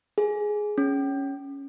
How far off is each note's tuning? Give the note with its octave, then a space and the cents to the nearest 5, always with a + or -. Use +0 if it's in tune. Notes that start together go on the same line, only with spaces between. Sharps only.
G#4 +10
C#4 +0